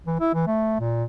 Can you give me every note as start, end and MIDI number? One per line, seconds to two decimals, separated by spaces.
0.06 0.18 52
0.20 0.30 64
0.34 0.45 52
0.47 0.77 57
0.80 1.04 46